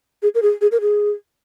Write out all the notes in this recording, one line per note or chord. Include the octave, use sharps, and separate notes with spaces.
G#4
A#4
G#4
G#4
A#4
G#4